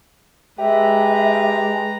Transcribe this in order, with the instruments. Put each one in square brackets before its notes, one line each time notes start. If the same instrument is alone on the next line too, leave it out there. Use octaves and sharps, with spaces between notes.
[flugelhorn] G#3 [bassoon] G4 [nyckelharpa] B4 A#5 [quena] E5